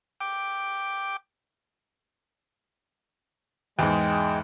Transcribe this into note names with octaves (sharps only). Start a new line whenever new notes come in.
G5 D6
E2 G#2 G#3 G5